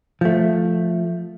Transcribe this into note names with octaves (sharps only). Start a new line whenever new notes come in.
F3 A3